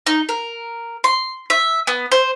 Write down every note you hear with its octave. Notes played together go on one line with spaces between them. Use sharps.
D#4
A#4
C6
E5
B3
C5